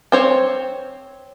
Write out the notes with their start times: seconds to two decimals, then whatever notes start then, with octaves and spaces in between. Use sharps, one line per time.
0.12 C4 C5 C#5